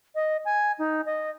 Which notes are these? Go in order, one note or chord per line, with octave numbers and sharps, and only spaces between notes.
D#5
G#5
D#4
D#5